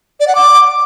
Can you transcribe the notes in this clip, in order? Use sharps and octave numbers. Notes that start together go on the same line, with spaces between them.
D5
F#5
D6